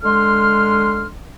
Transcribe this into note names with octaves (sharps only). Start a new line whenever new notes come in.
D3 G#3 C6 F6